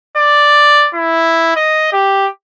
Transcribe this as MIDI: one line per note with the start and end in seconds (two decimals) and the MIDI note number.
0.17 0.89 74
0.95 1.54 64
1.56 1.90 75
1.93 2.28 67